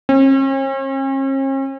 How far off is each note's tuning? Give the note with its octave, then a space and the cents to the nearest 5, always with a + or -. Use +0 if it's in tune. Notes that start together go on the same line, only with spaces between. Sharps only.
C#4 -45